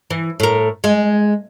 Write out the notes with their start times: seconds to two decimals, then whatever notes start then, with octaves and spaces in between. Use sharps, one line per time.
0.10 E3
0.40 A2 A#4
0.84 G#3